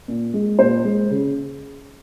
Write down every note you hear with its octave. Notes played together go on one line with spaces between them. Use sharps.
A#2
G#3
A#2 C5
G#3
C#3